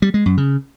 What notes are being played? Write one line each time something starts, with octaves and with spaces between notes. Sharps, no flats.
G3
G#3
F#2
C#3